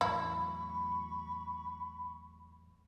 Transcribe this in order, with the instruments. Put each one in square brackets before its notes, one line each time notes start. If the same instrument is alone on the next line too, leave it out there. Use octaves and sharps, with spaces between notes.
[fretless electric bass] E2 A2 F#3 [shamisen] E4 [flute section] B5 C#6